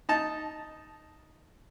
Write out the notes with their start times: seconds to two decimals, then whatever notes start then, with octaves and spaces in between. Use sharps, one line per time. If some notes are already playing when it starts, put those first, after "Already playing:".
0.09 D#4 A5